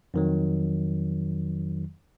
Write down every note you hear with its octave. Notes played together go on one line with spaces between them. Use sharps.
F2 D#3 F#3